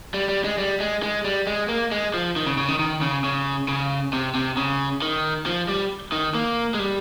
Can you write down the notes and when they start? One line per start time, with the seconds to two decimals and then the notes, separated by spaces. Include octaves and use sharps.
0.14 G3
0.29 G3
0.44 G#3
0.58 G3
0.80 G#3
1.03 G#3
1.24 G3
1.47 G#3
1.69 A#3
1.91 G#3
2.14 F3
2.36 D#3
2.47 C#3
2.58 C#3
2.68 D#3
2.79 D#3
3.01 C#3
3.24 C#3
3.68 C#3
4.13 C3
4.35 C3
4.57 C#3
5.02 D#3
5.46 F3
5.68 G3
6.12 D#3
6.35 A#3
6.74 G#3
6.79 G3